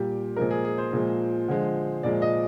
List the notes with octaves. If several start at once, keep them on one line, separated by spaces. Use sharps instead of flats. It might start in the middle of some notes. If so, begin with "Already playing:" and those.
Already playing: A#2 G3 G4
A#2 F3 G#3 A#4
G#4
G#4
C5
A#2 F3 G#3
D3 F3 G#3
A#2 F3 G#3 D5
D#5